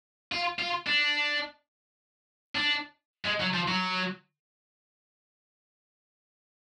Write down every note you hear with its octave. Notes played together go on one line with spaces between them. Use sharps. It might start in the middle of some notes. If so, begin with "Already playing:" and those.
F4
F4
D4
D4
G#3
F#3
F3
F#3